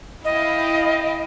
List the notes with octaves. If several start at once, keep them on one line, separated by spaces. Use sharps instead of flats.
E4 D#5 F5 G5